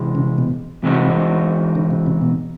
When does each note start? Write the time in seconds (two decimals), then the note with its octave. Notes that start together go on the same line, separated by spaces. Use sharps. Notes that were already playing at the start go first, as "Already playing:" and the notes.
Already playing: C3 E3 G#3
0.15 C#3
0.38 B2
0.83 C3 E3 G#3 C4 D#4 F#4
1.75 D3
1.91 C3
2.06 C3
2.21 B2